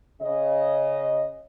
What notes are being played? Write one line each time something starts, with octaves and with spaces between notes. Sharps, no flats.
C#3 D#5